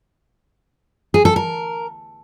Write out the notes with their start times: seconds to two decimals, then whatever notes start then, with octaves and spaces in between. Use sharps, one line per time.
1.14 G#4
1.25 A4
1.36 A#4